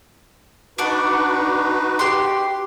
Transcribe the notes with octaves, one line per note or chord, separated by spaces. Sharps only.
D4 D#4 F#4 B4 F#5
G4 C6